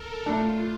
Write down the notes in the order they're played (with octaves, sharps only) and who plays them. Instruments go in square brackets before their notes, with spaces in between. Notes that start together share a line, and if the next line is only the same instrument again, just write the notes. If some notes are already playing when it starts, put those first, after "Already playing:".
Already playing: [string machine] A4 A#4
[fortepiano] A2 A3 D4 A4 [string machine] F4